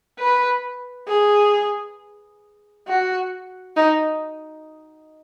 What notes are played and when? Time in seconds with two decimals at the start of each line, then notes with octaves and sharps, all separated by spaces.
0.19 B4
1.08 G#4
2.88 F#4
3.76 D#4